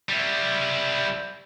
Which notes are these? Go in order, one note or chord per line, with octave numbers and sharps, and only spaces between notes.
G3 E4